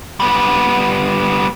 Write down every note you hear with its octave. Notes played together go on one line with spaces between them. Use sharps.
G3 B3